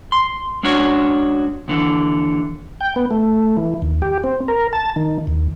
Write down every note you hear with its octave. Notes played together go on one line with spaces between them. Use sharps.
C6
G#3 C#4 D4 F#4 C#5
D#2 D3 E3
G5
B3
A3
E3
D#2
G4
C4
A#4
A5
D#3
D#2